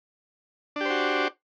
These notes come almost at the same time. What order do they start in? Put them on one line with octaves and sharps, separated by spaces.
D4 G4 C5 F#4